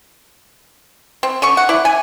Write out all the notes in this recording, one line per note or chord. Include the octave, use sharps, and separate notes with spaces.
C4
D3 C#4 C#6
F#5
E4 D5
G#5